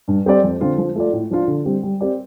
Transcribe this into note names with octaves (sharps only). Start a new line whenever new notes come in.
G2
G3 C4 G4 D5
F2
D3 F3 C4 F4
F3
A3 F4 D5
A2
F3 D4 F4
D3
G3 C4 G4
G3
C4 G4 D5